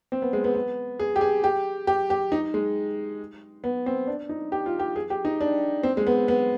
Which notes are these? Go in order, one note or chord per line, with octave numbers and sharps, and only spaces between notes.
C4
B3
G#3
B3
B3
G#4
G4
G#4
G4
G4
G4
D#4
G#3
B3
C4
D4
D#4
G4
F4
G4
G#4
G4
D#4
D4
C4
G#3
B3
B3